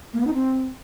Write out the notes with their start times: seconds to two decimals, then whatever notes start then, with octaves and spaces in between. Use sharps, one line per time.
0.14 A#3
0.20 B3
0.27 D#4
0.34 C4